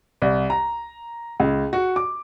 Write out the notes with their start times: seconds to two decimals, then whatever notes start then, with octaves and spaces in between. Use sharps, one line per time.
0.22 C2
0.50 A#5
1.40 C#2
1.73 F#4
1.96 D6